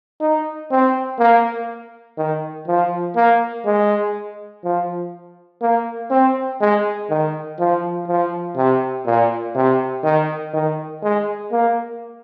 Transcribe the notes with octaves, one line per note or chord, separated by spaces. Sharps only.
D#4
C4
A#3
D#3
F3
A#3
G#3
F3
A#3
C4
G#3
D#3
F3
F3
C3
A#2
C3
D#3
D#3
G#3
A#3